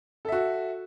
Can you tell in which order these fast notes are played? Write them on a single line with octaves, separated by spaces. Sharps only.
A4 E5 F#4